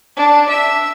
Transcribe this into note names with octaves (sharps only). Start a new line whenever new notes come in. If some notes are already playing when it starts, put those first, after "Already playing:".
D4
E5